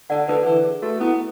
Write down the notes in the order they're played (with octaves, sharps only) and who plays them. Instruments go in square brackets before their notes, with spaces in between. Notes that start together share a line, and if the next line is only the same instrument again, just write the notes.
[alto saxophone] D3 [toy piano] D5 F#5
[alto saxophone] D3 [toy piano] B4 D5
[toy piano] A4
[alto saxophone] E3 [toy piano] B4
[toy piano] G#4
[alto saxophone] A3 [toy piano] F#4
[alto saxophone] B3 [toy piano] E4